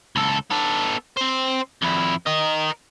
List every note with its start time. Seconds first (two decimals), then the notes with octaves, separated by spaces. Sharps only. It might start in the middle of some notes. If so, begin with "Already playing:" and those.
0.16 C#2 A4
0.50 B3 A4
1.17 C4 C5
1.82 F2 E4
2.27 A#4 D#5